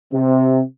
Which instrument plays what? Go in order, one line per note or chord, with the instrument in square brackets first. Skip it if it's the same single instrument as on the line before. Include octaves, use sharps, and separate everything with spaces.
[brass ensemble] C3